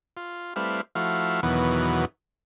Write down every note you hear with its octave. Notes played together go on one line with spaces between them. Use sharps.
F4
G3 A3 C4 E4 B4 F5
F3 A3 E4 F#4 F5
E2 B2 D#3 E3 F#3 B3